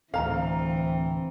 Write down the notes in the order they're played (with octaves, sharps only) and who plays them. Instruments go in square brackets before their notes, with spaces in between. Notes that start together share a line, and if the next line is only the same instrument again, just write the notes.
[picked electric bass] D1 D2 [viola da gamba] E3 [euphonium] C4 [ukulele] F5 A#5